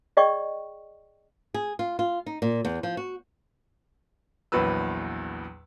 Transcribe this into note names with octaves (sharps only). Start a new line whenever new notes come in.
G#4 D5 D#5 G5 C#6
G#4
F4
F4
D#4
A#2
E2
F3
F#4
A#1 E2 F#3 B4 E6